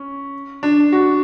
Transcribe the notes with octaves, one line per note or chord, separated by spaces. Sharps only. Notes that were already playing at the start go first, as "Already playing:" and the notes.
Already playing: C#4
D4
F#4